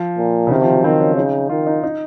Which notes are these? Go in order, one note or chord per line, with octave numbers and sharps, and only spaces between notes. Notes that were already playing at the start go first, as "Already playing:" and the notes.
Already playing: F3
A#2
C#3
C3 D#3
F3
F#3
D#3 C4
C#4
C#3 D#4
D#3 F4
D#4
D#4